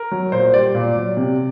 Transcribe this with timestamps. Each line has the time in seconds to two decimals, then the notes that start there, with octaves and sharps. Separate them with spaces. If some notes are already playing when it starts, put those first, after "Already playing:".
Already playing: A#4
0.12 F#3
0.32 A#2 C5
0.54 G3 D5
0.75 A#2
0.96 F#3
1.17 C3